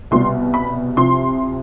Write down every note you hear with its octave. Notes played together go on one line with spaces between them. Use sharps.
C2 B2 G3 C6
B5
C2 C3 F3 C6